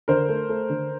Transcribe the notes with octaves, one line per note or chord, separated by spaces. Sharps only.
D3 A#4 C5
A3
A3
D3